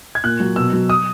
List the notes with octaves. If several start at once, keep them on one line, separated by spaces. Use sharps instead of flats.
G#6
A#2 F#6
F#3
B2 E6
F#3
D#6